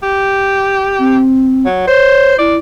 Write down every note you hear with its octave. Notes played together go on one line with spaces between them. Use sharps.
G4
C4
F#3
C5 C#5
E4 D5